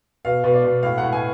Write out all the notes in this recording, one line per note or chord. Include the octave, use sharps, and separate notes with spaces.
B2 F5
B2
D5
B2
A2 F5
A2 F#5
G#5